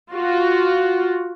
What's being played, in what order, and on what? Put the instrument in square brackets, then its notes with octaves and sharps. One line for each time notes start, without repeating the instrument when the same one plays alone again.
[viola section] F4 F#4